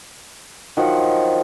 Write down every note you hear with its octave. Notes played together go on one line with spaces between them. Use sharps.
D#3 F3 F#3 F#5